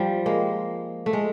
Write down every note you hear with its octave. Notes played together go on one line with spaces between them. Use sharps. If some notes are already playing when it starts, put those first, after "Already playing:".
Already playing: F3 G3
G#3 A#3
A3
G#3